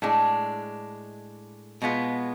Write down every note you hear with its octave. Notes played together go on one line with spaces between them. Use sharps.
A2 G#3 D4
B2 G#3 B3 F4